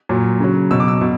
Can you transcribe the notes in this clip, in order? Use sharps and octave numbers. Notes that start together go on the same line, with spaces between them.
A#2 F#3
C#3 F#3
B2 F#3 E6
D6
E6
B2